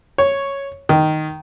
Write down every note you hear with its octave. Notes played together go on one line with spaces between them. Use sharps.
C#5
D#3